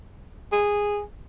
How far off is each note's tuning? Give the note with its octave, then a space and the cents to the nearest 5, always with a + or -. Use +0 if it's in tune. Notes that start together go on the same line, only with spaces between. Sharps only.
G#4 -10